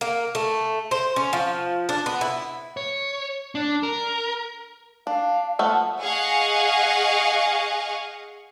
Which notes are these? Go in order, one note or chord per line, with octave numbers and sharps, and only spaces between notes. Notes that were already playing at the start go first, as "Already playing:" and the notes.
A#3
A3
C5
C#4
F3
D4
B3
E4
C#5
D4
A#4
D4 F5
F3 A3 B3 F#5
G#4 D#5 F5 F#5 G#5 C#6